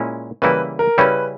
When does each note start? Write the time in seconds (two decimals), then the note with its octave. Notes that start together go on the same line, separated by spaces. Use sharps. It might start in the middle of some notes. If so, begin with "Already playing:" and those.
Already playing: A#2 G#3 C#4 E4
0.42 C#3 E3 G3 A#3 E4 B4
0.79 A#4
0.98 C#3 G3 C#4 E4 B4